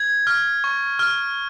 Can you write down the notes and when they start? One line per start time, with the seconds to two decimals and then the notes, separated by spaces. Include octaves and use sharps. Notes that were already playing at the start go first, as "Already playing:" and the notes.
Already playing: G#6
0.27 F6
0.64 C#6
0.99 F6